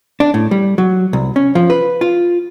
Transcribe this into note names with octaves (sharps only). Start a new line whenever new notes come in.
D4
A2
G3
F#3
C2
C#4
F3
B4
F4